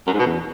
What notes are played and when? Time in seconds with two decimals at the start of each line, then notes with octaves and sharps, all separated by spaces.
0.07 F#2
0.13 G#2
0.20 B2
0.26 E2